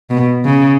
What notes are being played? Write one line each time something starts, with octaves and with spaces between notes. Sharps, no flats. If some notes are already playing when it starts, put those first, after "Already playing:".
B2
C#3